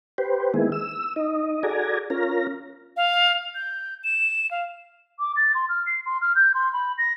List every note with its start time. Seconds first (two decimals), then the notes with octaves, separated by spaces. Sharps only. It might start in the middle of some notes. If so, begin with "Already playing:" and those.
0.18 G4 B4 C5
0.54 D#3 G#3 A#3 B3 E4 G#4
0.72 E6
1.16 D#4 D#5
1.63 F#4 G#4 A4 D5 G#5 A#5
2.10 C#4 F4 A#4 A#5
2.97 F5
3.55 G6
4.04 E7
4.51 F5
5.19 D6
5.36 A6
5.54 C6
5.69 F6
5.86 C7
6.05 C6
6.21 F6
6.35 G6
6.54 C6
6.73 B5
6.98 A#6